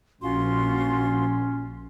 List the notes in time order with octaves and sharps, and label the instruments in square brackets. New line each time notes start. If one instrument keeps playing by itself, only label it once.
[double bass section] A#1 [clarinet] C#4 [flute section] F4 F#4 C6